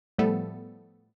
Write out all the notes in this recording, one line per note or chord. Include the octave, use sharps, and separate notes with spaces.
A2 F3 G3 A3 B3 A4